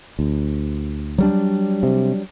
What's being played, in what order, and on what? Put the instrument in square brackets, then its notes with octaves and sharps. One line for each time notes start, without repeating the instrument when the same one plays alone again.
[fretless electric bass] D2
[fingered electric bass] F#3 G3 D4
[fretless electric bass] C3